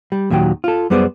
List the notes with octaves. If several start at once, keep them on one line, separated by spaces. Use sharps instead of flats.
G3
D#2 A#2 D#3 F#3 G5
F4 A4
F#2 G3 B3 G#4 C5 D5